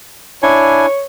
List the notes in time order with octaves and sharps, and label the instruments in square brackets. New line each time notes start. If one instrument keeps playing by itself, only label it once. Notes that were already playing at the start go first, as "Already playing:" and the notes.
[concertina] D4 E4 G#5 [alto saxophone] C#5